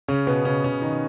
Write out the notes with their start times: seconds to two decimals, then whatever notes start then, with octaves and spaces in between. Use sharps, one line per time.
0.08 C#3 C#4
0.27 B2 B3
0.45 C#3 C#4
0.64 C#3 C#4
0.82 D#3 D#4